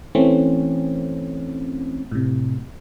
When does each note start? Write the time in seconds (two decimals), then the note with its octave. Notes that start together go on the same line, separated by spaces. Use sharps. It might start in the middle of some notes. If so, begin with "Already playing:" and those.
0.15 E3 A3 C4 C#4
2.11 A2 C3